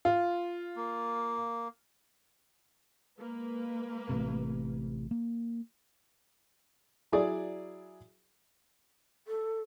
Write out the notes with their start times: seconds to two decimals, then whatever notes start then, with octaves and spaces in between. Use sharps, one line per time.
0.05 F4
0.76 A#3
3.18 G#3 A#3 B4
4.09 A1 A2 C3
5.11 A#3
7.12 F#3 E4 G#4 D5
9.27 A4